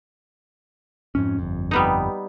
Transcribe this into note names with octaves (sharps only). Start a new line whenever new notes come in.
F2 G#2 C#4
G1 F2
G3 B3 D#4